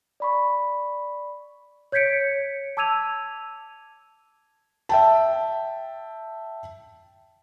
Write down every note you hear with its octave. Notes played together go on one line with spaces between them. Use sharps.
D5 B5 C#6
C#5 G6 G#6 B6 C#7 D7
A5 D6 E6 G#6 D#7 F7
E5 G5 A5